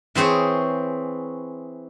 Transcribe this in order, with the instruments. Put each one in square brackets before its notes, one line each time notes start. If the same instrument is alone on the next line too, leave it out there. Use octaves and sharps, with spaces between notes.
[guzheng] E3 C4 G#4 C5 C#5